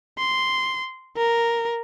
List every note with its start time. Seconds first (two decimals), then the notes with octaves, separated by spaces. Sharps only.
0.19 C6
1.17 A#4